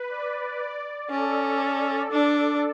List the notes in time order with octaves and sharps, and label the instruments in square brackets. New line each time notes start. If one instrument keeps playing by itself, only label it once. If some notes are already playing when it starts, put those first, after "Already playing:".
Already playing: [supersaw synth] B4
D5
[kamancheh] C#4 [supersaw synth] A4
[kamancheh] D4